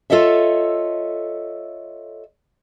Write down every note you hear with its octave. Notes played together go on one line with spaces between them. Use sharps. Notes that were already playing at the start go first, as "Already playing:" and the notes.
F4 A4 C#5 D#5 E5